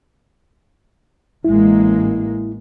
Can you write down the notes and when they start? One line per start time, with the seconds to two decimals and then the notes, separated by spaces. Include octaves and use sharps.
1.44 A1 G#3 A#3 E4